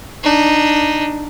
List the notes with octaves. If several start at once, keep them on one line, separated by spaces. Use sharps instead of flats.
D4 D#4